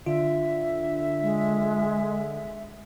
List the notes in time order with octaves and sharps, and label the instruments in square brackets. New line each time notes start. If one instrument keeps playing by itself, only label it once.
[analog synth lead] D3 [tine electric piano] F4 [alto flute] E5
[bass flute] G#3